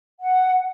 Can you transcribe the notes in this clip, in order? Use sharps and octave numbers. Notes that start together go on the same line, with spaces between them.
F#5